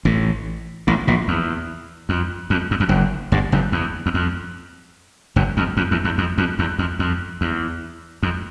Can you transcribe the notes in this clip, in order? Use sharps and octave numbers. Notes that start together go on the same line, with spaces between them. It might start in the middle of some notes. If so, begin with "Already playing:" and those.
A1 A2
A1 A2
A#1 A#2
E2
F2
F2
F#2
F2
F#1 F#2
G1 G2
F#1 F#2
E2
E2
F2
F#1 F#2
F2
F2
E2
E2
F2
F2
E2
F2
F2
E2
F2